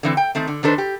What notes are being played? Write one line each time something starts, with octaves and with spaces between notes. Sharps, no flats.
D3 E3 C4
G5
D#3 A3 C4
D3
D#3 D4 A4 B4 C5
G4